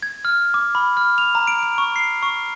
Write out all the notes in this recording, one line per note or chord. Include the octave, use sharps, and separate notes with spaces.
G#6
F6
D6
B5
F6
F7
A#5
D7
D7
C#6
C7
C#6